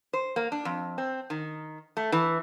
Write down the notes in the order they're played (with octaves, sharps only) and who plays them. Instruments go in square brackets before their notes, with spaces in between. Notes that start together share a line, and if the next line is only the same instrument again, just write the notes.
[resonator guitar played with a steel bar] C5
A#3
D4
F2
C4
D#3
A3
E3